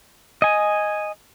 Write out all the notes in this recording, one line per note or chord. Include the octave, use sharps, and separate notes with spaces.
D#5 G#5